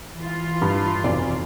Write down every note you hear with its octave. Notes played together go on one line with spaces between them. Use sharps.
E3 F4
G2
F1 B1 D5